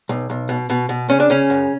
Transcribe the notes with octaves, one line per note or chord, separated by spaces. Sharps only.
B1
B1
B2
B2
B2
C#3 C#4
D4
C#3 C#4
F#2